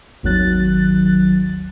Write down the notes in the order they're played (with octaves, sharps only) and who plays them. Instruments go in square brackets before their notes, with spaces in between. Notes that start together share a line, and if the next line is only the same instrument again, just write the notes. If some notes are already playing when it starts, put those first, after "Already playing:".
[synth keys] G#1 D#2 D#3 F#3 F#6 A6